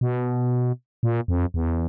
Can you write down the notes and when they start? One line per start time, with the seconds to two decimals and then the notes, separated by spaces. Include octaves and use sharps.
0.01 B2
1.03 A#2
1.28 F2
1.54 E2